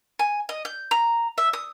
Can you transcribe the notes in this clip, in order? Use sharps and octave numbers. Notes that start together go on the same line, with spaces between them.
G#5
D#5
G6
A#5
E5
D#6